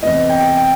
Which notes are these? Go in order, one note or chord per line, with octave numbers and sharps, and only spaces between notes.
E2 C3 E3 D#5
G5
G5